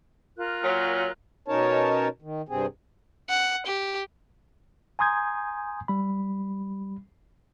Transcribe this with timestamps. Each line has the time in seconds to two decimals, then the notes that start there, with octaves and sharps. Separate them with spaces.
0.37 F4 A#4 F#6
0.63 A#2 F#3
1.48 B2 C#4 D#4 A#4 C#5 A5
2.22 D#3
2.49 G2 C3 C4 G#4
3.29 F#5
3.66 G4
4.99 G#5 A#5 C6 D#6 G6 G#6
5.88 G3 B5